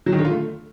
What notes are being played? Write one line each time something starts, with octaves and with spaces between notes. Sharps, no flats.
F#3
D#3
D3
F4
A3